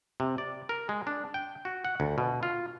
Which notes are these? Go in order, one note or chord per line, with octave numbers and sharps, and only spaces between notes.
C3
D5
A#4
G#3
D4
G5
F#4
F#5
D2
B2
F4